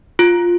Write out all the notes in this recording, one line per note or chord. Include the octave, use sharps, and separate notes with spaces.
F4